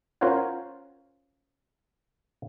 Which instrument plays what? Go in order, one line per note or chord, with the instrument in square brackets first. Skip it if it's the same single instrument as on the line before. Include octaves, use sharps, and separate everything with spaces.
[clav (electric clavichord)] C#4 F4 A#4 C5 C#5 F#5